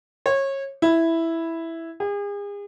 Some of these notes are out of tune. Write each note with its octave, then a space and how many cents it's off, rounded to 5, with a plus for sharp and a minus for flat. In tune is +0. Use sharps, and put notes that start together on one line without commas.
C#5 -25
E4 +0
G#4 -40